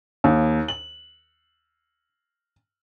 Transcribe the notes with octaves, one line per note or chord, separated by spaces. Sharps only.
D#2
F#7